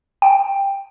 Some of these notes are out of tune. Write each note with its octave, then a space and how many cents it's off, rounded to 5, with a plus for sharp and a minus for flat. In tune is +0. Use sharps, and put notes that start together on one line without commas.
G5 +10